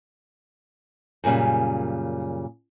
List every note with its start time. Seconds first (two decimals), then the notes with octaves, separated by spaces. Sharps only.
1.24 F#2 A#2 C#3 G3